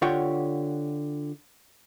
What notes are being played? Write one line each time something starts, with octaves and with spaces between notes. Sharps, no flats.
D3 F4 G4 C#5 F#5 G5